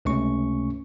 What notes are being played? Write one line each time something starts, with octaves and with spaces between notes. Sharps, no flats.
C#2 C3 A3 C#4 C#6